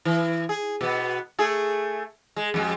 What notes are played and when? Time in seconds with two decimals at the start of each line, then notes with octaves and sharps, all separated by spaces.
0.05 E3
0.49 G#4
0.81 B2 B3
1.39 A3 G#4
2.36 G#3
2.54 F2 G#3 G4